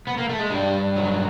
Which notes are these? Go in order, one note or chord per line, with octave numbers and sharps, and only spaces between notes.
B3
A#3
A3
G#3
G2 G3
F#3